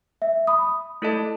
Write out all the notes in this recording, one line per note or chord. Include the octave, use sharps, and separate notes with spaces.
E5
B5 D#6
A3 E4 A4 D#5 A5